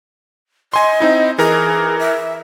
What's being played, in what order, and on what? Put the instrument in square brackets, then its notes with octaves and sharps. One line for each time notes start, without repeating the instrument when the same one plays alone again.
[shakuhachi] D#5 [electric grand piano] G#5 C6
[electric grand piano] C4 D#4 E4
[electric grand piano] E3 A#4 A#5 [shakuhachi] G#4
[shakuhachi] E5